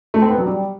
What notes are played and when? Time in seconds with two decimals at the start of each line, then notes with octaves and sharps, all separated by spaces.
0.14 A3
0.22 C4
0.30 B3
0.38 F#3
0.46 G3